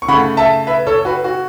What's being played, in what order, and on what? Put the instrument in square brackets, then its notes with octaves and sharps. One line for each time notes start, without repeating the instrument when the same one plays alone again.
[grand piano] C#6
C#3 F#5 B5
A3
E5 A5
B4 E5
A4 C#5
F#4 B4
F#4